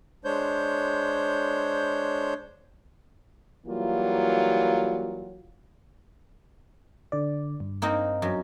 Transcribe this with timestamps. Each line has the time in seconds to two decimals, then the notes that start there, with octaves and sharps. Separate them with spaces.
0.25 G#3 D4 C5 C#5 G6
3.66 E3 F#3 G3 A#3 F4
7.12 D3 D5
7.60 G2
7.82 A#3 C4 D#4
8.22 F#2